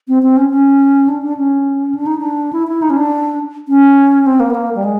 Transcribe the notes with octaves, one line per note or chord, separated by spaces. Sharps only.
C4
C4
C#4
C#4
D4
D4
C#4
D4
D#4
D4
E4
E4
D#4
C#4
D4
C#4
C4
A#3
B3
A#3
G3
G#3